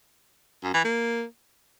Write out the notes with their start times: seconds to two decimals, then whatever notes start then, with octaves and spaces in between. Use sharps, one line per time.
0.63 F#2
0.74 E3
0.84 A#3